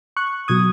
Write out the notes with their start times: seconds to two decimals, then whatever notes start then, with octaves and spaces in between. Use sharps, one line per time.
0.17 C#6 F#6
0.48 B2 F#3 D#6 G#6